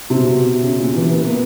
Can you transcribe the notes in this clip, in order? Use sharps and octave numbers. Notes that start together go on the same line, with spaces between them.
C3
B2
C3
C#3
A#2
E3
A#3
B3
A#3